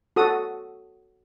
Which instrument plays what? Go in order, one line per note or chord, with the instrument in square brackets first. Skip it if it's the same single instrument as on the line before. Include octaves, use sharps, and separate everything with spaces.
[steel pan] F#4 A4 D#6